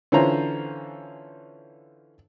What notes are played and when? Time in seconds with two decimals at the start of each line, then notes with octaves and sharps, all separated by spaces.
0.12 D3 E3 C#4 F4 C5 A#5